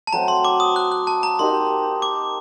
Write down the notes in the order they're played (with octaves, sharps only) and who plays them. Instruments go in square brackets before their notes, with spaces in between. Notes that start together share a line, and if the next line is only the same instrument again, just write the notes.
[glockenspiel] A5
[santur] F#3 A3 C4 F#4 [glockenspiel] A#5
[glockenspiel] C6
D6
D#6
F#6
F#6
A5
A#5
[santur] A#3 D#4 G4 [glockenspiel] C6
[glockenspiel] D6